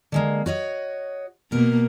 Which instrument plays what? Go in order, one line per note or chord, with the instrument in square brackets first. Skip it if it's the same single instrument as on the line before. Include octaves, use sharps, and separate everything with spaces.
[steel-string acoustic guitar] D3 G#3 A#3
F#4 C#5 D#5
[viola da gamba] B2 A#3 [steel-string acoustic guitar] A#4